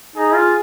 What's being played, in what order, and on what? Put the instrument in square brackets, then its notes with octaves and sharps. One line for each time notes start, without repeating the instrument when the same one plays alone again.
[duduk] D#4 [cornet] G#4
[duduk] F4